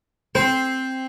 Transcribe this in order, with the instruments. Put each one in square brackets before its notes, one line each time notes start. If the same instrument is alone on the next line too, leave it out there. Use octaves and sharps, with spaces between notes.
[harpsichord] C4 [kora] C5